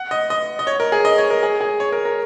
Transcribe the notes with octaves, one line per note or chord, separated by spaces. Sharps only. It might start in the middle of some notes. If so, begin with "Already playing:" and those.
Already playing: F#5
D#5
D#5
D#5
C#5
A#4
G#4
D#5
C#5
A#4
G#4
G#4
C#5
A#4
A#4